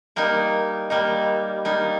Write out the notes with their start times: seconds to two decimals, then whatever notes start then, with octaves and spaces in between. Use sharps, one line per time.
0.16 G3 A#3 D#4
0.90 G3 A#3 D#4
1.65 G3 A#3 D#4